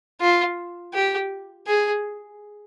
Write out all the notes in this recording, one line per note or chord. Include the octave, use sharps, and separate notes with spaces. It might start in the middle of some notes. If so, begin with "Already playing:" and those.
F4
G4
G#4